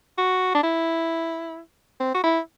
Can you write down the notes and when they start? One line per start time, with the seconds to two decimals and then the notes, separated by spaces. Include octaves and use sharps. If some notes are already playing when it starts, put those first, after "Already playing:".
0.18 F#4
0.55 D4
0.63 E4
2.00 C4
2.14 F#4
2.23 E4